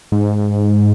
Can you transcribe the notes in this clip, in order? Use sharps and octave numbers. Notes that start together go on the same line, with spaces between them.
G#2